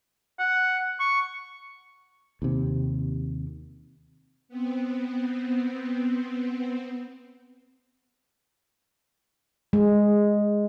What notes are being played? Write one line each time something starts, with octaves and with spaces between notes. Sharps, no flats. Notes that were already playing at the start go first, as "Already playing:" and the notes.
F#5
C#6
D#2 C3
B3 C4
G#3